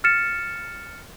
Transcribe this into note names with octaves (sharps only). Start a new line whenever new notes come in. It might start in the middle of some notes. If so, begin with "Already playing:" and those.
F6 A6 C#7 E7